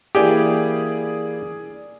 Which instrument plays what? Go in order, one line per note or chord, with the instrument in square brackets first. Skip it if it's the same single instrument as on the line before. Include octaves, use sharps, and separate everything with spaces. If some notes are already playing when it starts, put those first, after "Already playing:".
[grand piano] E3 A#3 E4 [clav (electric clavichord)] G4 G5 G#5 [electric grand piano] G#4 D5